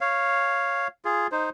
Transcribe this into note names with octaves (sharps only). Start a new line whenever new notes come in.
C#5 F5
F4 G#4
D#4 C5